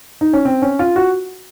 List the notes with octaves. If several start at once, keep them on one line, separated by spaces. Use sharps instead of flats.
D#4
C#4
C4
C#4
F4
F#4